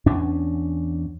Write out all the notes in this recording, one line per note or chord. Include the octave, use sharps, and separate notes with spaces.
E2 C#4 D4